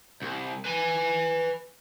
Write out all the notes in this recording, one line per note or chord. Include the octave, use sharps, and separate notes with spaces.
C2
B4 G#5